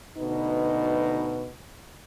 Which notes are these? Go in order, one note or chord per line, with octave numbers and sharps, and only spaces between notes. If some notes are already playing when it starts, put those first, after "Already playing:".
D2 B2 D#4 B4